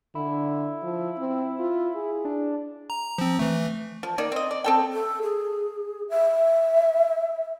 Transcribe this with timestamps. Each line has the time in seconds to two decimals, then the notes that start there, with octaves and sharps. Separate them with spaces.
0.15 D3 E4
0.83 F3
1.18 C4
1.59 F4
1.95 G#4
2.25 D4
2.90 A#5
3.18 F3 C4
3.39 E3 A3
4.03 F3
4.18 D#3 A#3 D#4 D5
4.32 C4 D#5
4.51 D5
4.64 C4 A4 G5
4.93 A4
5.22 G#4
6.10 E5